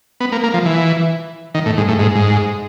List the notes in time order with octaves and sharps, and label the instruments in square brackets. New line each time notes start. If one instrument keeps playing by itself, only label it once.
[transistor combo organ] B3
A#3
A#3
F3
E3
D#3
A2
G#2
A2
G#2
G#2